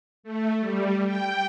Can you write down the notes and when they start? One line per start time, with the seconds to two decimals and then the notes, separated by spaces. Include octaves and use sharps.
0.23 A3
0.60 G3
1.05 G5